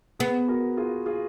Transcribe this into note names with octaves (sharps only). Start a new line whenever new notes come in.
B3 G#4 B4
F#4 A#4
F4 G#4
F4 G#4